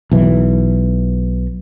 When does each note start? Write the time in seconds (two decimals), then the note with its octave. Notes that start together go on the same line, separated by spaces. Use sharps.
0.12 B1 E3